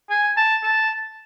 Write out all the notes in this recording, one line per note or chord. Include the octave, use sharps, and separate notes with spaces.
G#5
A5
A5